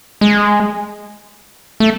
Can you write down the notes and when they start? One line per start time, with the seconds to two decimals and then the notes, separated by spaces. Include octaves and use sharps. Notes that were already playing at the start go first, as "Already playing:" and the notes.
0.21 G#3
1.80 A3